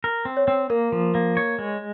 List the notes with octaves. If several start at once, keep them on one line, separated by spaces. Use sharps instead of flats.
A#4
C4
C#5
C4
A#3 A#4
F3
A#3
C#5
G#3